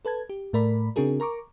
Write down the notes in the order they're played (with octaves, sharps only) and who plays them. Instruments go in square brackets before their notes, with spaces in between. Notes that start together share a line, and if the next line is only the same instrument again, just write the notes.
[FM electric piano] A4 B4 A5 G#6
G4
A2 A3 A#4 D5 B5
C#3 C4 D4 F#4 G#4 A#4
A#4 A#5 C#6 D6